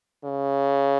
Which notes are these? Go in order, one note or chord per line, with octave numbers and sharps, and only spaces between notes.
C#3